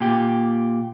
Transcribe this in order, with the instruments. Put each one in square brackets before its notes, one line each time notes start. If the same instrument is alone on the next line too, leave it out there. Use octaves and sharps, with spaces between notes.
[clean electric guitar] A#2 G4